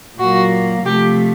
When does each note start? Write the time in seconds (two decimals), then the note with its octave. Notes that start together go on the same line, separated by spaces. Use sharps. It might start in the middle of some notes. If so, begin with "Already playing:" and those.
0.18 A#2 F#3 A#3 F#4
0.85 C3 F3 A3 G4